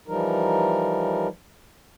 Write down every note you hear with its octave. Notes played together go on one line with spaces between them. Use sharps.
E3 F3 G3 D#4 A#4